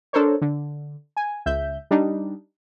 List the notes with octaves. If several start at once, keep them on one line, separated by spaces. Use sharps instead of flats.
D4 A4 A#4 C5 C#5
D3
G#5
C#2 E5 G6
G3 D4 D#4